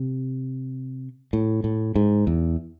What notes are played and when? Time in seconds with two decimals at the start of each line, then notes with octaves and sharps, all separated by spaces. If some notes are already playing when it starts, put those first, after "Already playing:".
Already playing: C3
1.33 A2
1.64 A2
1.95 G#2
2.27 E2